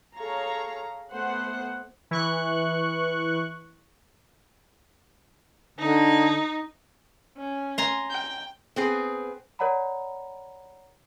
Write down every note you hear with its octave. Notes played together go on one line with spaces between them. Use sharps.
G#4 A4 C#5 F5 A#5
A3 B3 C5 F#5
E3 C#6 F#6
D3 D#4
C#4
G#5 A#5 C6
G5
B3 C4 G#4
A#4 C#5 D5 F#5 A#5 B5